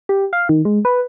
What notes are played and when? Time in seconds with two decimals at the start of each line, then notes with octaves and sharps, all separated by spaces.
0.09 G4
0.33 F5
0.49 D#3
0.65 G#3
0.85 B4